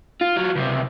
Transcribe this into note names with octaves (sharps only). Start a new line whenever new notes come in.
F4
F#3 F4
C#2 C3